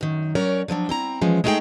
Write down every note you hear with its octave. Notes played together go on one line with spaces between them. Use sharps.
F#2 D#3
F#3 C#4 A#4 C#5 D5
D3 F3 F#3 D4
C4 E4 A#5
E3 F3 G#3 C#4
G#3 A3 D#4 F4 G#4 G5